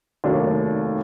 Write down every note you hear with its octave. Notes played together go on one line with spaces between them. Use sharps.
F1 D#2 D#3 F#3 D4